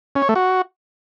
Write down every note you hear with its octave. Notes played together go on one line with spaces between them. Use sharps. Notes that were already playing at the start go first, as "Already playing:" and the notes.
C#4
C#5
A3
F#4